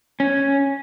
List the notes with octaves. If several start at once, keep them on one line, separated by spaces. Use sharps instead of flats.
C#4